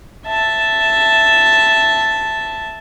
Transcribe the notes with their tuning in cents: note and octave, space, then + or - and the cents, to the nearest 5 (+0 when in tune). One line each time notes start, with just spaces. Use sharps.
E5 +0 A5 +0